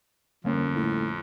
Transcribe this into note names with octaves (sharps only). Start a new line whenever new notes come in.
G1 F2 A#3 C#4
A2